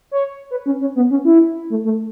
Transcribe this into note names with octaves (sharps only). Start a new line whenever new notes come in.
C#5
B4
C#4
C#4
B3
C#4
E4
A3
A3